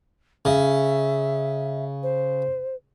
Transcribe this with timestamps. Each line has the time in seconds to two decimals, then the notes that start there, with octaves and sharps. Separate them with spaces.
0.45 C#3 E5
2.03 C5